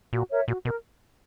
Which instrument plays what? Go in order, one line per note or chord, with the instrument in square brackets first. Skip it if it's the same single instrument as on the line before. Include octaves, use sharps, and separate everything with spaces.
[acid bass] A#2 [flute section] F#4
[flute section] A#4 C#5 E5
[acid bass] A#2 [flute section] F#4
[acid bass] B2 [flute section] A#4